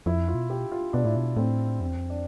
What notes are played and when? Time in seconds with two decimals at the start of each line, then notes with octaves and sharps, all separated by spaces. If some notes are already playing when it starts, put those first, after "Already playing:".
0.06 F2 E4
0.28 F4
0.35 B2
0.50 G4
0.72 F4
0.93 B2 D4
1.04 A2 E4
1.16 B2 D4
1.37 A2 C4
1.80 F2 C4
1.89 E2
1.96 F2
2.10 D4